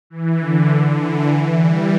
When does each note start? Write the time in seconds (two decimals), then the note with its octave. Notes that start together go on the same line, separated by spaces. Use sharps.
0.10 E3
0.40 D3
0.99 E3
1.30 E3
1.59 G3